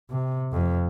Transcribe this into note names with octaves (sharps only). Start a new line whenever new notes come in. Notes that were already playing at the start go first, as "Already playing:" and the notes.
C3
F2